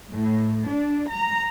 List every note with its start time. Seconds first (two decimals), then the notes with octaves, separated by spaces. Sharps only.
0.13 A2
0.69 D4
1.10 A#5